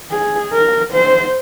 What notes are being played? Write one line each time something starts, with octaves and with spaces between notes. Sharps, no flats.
G#4
A#4
C5